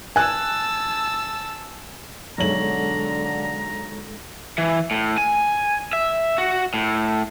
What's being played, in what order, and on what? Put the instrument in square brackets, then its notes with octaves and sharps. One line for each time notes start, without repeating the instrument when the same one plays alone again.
[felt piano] G#5 F#6 [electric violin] A5 E6
[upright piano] B1 C#5 F#7 [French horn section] D3 [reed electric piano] G#3 A4 [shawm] A#5
[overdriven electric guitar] E3
A2
G#5
E5
F#4
A2